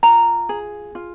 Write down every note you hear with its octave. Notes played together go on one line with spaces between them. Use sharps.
F4 A#5
G#4
F4